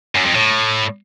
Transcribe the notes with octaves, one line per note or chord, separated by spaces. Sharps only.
F#2
F2
A2